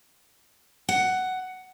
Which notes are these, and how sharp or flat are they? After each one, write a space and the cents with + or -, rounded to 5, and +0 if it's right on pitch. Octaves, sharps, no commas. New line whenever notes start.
F#5 +10